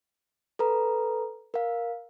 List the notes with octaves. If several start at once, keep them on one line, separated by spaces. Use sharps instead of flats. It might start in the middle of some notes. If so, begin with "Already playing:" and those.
A4 B4 A#5
A#4 F5